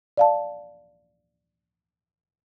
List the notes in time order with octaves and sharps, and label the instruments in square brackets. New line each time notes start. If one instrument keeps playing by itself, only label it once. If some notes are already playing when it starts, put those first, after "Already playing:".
[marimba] D5 F5 A5